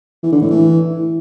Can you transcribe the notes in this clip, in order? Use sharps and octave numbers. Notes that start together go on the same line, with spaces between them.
E3
D3
A2
E3